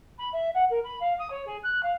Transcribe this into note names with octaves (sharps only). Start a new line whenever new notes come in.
B5
E5
F#5
A#4
B5
F5
D#6
C#5
G#4
F#6
F5